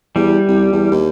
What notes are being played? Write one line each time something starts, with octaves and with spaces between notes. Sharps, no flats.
E2 G3
C2
E2
D#2